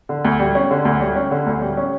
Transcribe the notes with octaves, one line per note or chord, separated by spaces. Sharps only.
D3
D2
G3
C#4
D3
D2
G3
C#4
D3
D2
G3
C#4